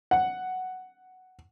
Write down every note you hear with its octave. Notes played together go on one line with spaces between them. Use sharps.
F#5